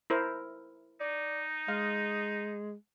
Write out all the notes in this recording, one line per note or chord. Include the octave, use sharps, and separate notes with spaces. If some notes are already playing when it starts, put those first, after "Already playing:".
E4 A#4 C5
D#4 D5
G#3 F5